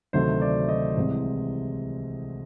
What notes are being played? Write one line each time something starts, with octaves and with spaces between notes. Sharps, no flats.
D2 C3 D#3 F#3 A3 C5
D5
D#5
C2 C3 E3 G#3 C4